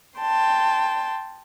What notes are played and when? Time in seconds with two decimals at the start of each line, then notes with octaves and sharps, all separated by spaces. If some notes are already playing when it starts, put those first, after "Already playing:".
0.19 G5 A5 C6